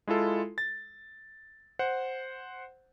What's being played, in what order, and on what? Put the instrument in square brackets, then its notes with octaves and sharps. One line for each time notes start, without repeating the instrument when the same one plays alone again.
[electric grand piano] G#3 E4 F4 A4
A6
C5 F#5